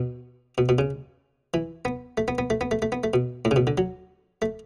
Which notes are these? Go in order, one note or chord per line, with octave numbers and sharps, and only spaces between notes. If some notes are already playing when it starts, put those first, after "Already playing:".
Already playing: B2
B2
B2
C#3
E3
B3
A3
B3
B3
A3
B3
A3
A3
B3
A3
B2
A2
C#3
B2
D3
F#3
A3